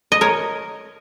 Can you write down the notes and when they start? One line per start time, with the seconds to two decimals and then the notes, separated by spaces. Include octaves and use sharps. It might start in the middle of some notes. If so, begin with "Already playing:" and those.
0.12 D#5
0.21 A#4 C#5